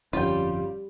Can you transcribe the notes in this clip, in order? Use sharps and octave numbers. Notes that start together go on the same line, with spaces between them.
G1 F2 G3 C#4 F4 G5